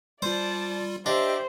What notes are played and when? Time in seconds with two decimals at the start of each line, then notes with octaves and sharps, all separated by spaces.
0.22 G3 F4 C5 D5 A5
1.06 D4 G4 C5 D#5 E5